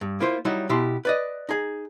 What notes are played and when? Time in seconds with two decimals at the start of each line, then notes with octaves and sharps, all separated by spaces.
0.01 G2
0.20 A#3 E4 F4 C5
0.45 F#3 G3 D#4 E4
0.69 B2 E4 G4 C6
1.05 B4 D5 D#5
1.49 D#4 G#4